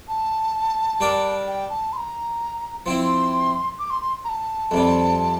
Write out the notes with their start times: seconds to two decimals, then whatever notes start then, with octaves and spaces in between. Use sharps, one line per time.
0.08 A5
1.00 G3 D4 G4 A#4
1.47 G5
1.70 A5
1.93 C6
1.97 A#5
2.86 F3 C4 E4 C6
3.79 D6
3.90 C6
4.02 C6
4.25 A#5
4.29 A5
4.71 F2 C3 G3